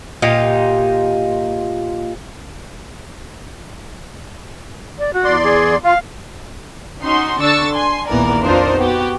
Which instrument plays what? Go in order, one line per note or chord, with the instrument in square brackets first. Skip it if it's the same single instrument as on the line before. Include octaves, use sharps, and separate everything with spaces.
[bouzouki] A#2 D#4 F4 G4
[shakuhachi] D5
F#4
[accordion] E2 D5 C6
[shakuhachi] G#4
[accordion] F4 [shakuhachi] F5
[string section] C#4 D#4 F#4 C6
D3 D4 C#6 E6 A6
G#5 C6
A#1 D#2 E3 B3 A#4 D5
F2 D4 D#4 F4 A#4 C5
B3 F#4 G4